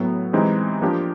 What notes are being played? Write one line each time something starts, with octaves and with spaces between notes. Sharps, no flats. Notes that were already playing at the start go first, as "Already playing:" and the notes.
Already playing: A2 F#3 B3
E3 G#3 C4 D#4 G4
F3 A#3 D4 G4